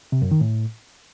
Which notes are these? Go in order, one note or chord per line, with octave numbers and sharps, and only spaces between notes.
C3
F#2
D#3
A2